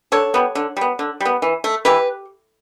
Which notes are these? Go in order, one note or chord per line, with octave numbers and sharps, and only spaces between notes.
D3 A4 C#5
G3 B3
D3
G3 B3
D3
G3 B3
E3
A3
E3 G4 B4